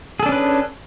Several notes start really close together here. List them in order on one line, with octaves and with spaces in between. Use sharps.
G#4 A4 D4 C#4 B4